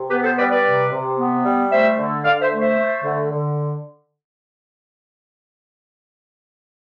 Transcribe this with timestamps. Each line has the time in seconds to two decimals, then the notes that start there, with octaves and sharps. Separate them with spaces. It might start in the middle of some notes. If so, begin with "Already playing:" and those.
Already playing: C3
0.10 B3 G4 B4
0.23 A4 C5
0.37 G3 B4 D5
0.50 B4 D5
0.64 C3
0.91 C3
1.17 B3
1.44 G3
1.71 A3 C5 E5
1.98 D3
2.24 D3 D5 F5
2.42 C5 E5
2.52 A3
2.60 C5 E5
2.78 A3
3.04 D3
3.30 D3